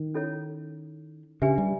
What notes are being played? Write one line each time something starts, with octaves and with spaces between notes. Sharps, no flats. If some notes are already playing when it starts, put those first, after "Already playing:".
Already playing: D#3
C#4 E4 A4 C#5
C#3 D4 G4 B4 E5 G#5
G3